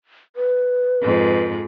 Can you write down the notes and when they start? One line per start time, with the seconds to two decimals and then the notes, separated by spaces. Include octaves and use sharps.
0.36 B4
1.02 F2 G#2